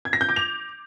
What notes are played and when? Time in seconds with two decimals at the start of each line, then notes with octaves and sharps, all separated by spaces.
0.05 G#6
0.13 A#6
0.21 G6
0.29 D6
0.36 F7